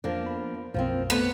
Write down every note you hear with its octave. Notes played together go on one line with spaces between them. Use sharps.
F2 F3 A#3 D4
B3 B5
B1 F#2 B2 F3 A#3 C4
A3 B3 C5 D5